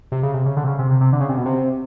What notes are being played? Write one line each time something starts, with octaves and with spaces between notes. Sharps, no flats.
C3
C#3
C3
C#3
D3
C3
C#3
C3
C3
C3
D3
C#3
C3
B2
C3